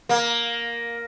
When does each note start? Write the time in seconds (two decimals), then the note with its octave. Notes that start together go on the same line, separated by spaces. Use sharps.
0.09 A#3